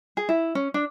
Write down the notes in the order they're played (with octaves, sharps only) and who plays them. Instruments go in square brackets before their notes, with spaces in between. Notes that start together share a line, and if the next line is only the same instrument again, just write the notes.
[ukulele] G#4
E4
C#4
D4